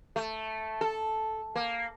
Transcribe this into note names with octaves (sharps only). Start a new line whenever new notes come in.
A3
A4
A#3